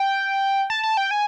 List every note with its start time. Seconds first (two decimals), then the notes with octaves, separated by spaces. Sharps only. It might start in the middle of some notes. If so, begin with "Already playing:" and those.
Already playing: G5
0.70 A5
0.84 A5
0.97 G5
1.11 G#5